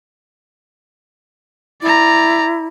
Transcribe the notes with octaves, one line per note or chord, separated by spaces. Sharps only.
E4 D5 A#5